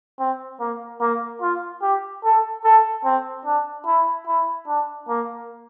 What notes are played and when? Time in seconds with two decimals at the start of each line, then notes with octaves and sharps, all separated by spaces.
0.19 C4
0.60 A#3
1.01 A#3
1.42 F4
1.82 G4
2.24 A4
2.64 A4
3.05 C4
3.45 D4
3.86 E4
4.27 E4
4.67 D4
5.08 A#3